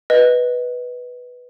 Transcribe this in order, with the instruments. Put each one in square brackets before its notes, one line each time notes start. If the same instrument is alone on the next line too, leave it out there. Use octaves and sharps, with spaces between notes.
[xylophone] B4 D#5